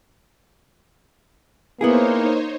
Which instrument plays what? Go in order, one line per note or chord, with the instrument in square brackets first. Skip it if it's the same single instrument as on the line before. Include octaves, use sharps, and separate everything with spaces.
[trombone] A#3 [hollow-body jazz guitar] B3 E4 G#4 [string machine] D#4 C5 C#5